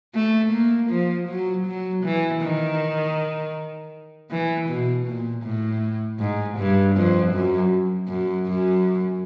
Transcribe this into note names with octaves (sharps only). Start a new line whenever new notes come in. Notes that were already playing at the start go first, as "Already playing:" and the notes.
A3
A#3
F3
F#3
F#3
E3
D#3
E3
B2
A#2
A2
G#2
G2
F2
F#2
F#2
F#2